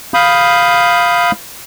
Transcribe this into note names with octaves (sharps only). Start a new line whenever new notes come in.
F5 B5 D#6 G6